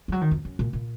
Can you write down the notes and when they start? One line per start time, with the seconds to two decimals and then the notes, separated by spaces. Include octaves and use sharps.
0.08 F3
0.12 F#3
0.21 D#3
0.31 F2
0.45 F#2
0.59 A#2
0.73 A#2